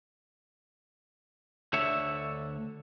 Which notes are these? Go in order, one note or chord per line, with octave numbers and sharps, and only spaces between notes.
D2 D3 C#5 E5